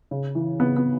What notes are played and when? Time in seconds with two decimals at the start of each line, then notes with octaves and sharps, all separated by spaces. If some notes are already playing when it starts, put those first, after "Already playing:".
0.11 C#3
0.35 E3
0.59 C#3 B3
0.76 B3